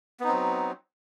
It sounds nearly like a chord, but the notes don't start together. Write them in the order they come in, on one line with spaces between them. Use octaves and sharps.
B3 D#4 C4 F#3